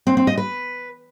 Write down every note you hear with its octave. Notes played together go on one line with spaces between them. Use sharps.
C4
C4
D#5
B4